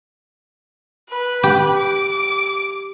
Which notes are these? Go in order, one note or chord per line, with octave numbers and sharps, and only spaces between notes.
B4
G4
D6